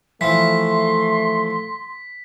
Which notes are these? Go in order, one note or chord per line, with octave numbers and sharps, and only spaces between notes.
E3 F3 A3 C6 B6